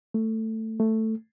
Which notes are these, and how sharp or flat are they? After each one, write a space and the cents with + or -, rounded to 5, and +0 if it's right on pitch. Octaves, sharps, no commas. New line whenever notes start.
A3 +10
A3 +5